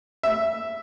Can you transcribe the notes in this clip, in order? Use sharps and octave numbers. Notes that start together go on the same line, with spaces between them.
E5